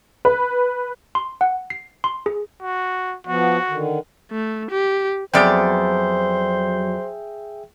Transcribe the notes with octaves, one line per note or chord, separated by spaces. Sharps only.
B4
C6
F#5
C7
C6
G#4
F#4
F3 B3 F#4
D3 D#3
A3
G4
F2 F#3 B3 G#4 C5 D5 E5 G5